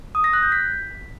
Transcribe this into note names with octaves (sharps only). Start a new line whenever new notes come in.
D#6
A#6
F#6
G6
B6